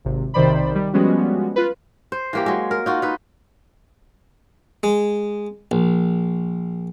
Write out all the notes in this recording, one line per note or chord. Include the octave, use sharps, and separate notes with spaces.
G#1 C3
B1 C3 D#3 C5 D5 B5
D#3 G3
F3 G3 G#3 B3 C#4 F#4
F4 B4
C5
E3 A#3 G4
F#3 G#3
A#4
D#4 F4 F#4
D#4 B4
G#3
A#1